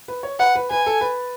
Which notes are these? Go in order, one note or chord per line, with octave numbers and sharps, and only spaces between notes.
B4
C#5
B4 F#5
B4
B4 G#5
A4
B4